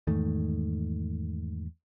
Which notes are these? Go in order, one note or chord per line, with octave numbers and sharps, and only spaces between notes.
E2 G#2 D#3 A3